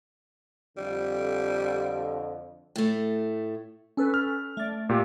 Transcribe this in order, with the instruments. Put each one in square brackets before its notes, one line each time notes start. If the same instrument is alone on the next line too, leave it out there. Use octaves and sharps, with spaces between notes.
[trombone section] F2 D3 [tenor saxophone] G3
[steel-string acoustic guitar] A2 A3
[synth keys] C#4 A4 B4
[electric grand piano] F6
[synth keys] A3 D5
[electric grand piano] A#2 G4